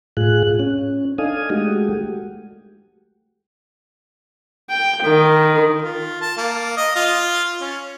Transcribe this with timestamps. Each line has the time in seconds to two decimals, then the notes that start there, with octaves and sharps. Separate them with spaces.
0.17 A2 F4 G#4 F#6
0.60 C#4
1.18 D4 D#4 A4 F5 G#5 D#6
1.50 G#3 A3 F#4 G4
4.70 G5
5.04 D#3
5.82 F4
6.22 A5
6.37 A#3
6.77 D#5
6.96 F4
7.61 C#4